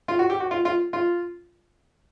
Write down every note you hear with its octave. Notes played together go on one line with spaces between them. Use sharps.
F4
F#4
G4
F#4
F4
F4
F4